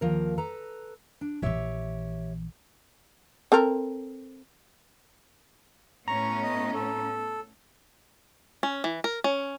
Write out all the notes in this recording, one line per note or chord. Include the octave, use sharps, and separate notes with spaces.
D#2 F3 A#4
A4 B4 A#5
D4
A#1 E3 G4 C#5 E5
C4 A4 A#4
A2 B3 C#4 A#5 C#6
D#5
A4
C#4
E3
A#4
C#4